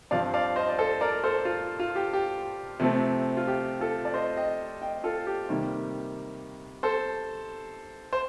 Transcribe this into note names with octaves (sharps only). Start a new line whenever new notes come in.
G2 F3 C4 D5 F5
D5 F5
C5 D#5
D5
A4 C5
A#4 D5
A4 C5
F4
F4
G4
G4
C3 F3 A3 C4
F4
G4
F4 A4
D5
C5 D#5
D#5 G5
D#5 G5
F4 A4
G4
C3 D#3 G3 A#3
A4 C5
C5